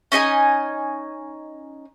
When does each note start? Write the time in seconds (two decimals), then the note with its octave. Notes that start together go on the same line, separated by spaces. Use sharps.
0.12 C#4 D#4 D#5 G#5